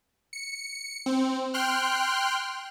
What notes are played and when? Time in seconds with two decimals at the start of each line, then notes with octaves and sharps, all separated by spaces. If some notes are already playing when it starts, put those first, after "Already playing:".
0.33 C#7
1.06 C4
1.54 G5 C6 F6 F#6